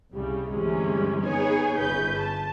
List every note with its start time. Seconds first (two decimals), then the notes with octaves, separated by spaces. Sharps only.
0.13 C2 C#3 G3
0.51 D2 G2 C3 E3 G#3 C#4
1.24 B3 D#4 G#4 C#5 G#5
1.78 G1 C#3 B4 G6
2.18 A5